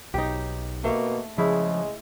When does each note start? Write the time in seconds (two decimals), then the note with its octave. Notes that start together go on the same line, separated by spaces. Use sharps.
0.14 B1 D#4 G4
0.84 B2 A3 A#3
1.38 C#3 F3 G#3 E4